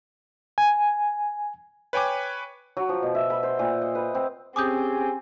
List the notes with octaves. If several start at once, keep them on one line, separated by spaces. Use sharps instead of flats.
G#5
B4 C#5 G5 G#5 D6
F#3
F3
B2
E5
B5
C5
A#2
D#5
B4
C4
C4 C#4 G4 G#4 G#5 D6 D#6 G6